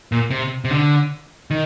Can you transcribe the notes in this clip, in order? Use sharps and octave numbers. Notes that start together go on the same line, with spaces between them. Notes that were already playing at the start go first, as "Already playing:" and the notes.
A#2
C3
C3
D3
D#3